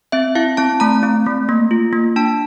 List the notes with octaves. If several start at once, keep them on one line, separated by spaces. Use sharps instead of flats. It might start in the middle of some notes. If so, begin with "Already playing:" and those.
C4 E5
E4 F5
C4 A5
A3 A#5
C4
A3
A#3
F4
A#3
D4 A5